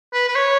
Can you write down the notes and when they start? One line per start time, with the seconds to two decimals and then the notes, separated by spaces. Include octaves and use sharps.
0.13 B4
0.28 B4
0.36 C#5